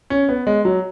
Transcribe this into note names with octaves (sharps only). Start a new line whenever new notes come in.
C#4
B3
G#3
F#3